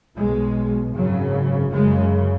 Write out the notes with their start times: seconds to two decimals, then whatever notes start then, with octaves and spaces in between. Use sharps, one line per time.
0.16 B1 B2 G#3
0.94 G#1 F#2 C#3 F#3
1.71 F#1 F#2 C#3 G#3